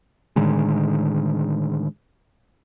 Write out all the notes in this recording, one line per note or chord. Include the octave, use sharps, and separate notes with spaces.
A2 D3 D#3 G#3